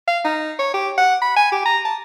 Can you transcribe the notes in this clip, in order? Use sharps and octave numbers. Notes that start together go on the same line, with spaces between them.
F5
D#4
C#5
G4
F#5
B5
G#5
G4
A#5
A5